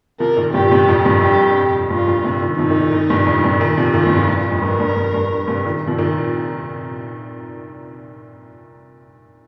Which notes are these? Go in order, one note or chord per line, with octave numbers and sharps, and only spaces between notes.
C3 F3 A#4
A#2 D#3
G2 C3 G4
A#2
G2 C3
F2 A#2
G2 C3
F2 G4
G2 F4
F2 A#2
G2 C3
A#2 D#3
C3 F3 D#4
A#2 D#3
A#2 D#3
A#2 D#3
G2 C3
F2 A#2
G2 C3
A#2 D#3
C3 F3
A#2 D#3 F4
G2 C3
F2 A#2
G2
F2
G2 A#4
G2
G2
G2
G2 C3
A#2 D#3
C3 F3
A#2 D#3